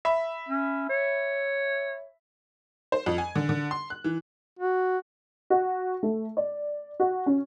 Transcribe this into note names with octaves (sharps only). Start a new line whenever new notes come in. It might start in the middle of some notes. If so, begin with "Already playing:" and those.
E5 B5
C#4
C#5
C5
F2
G#5
D3
D3
C6
F#6
E3
F#4
F#4
A3
D5
F#4
C#4